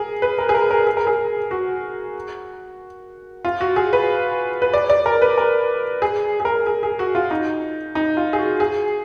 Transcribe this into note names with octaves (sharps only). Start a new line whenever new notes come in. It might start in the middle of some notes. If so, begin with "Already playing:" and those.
Already playing: G#4 A#4
B4
A#4
G#4
A#4
A#4
G#4
A#4
G#4
F#4
F4
F#4
G#4
B4
B4
D5
D5
A#4
B4
A#4
G#4
G#4
A#4
G#4
G#4
F#4
F4
D#4
D#4
F4
G#4
F#4
G#4